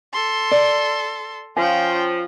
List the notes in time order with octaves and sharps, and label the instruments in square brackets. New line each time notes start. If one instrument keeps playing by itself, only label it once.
[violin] A4 C6
[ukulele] D5
[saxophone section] F3 [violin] C#4 G5 [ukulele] G#5